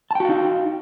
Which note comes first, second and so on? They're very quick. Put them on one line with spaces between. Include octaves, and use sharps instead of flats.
A5 G5 F#4 F5 D#4